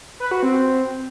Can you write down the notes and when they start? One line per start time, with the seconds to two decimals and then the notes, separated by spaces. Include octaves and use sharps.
0.20 B4
0.31 F#4
0.43 C4